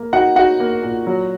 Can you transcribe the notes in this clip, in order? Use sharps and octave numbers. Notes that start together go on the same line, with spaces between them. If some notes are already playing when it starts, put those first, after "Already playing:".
Already playing: A#3
D#4 F#4 F#5
D#4 F#4 F#5
A#3
A#2
F#3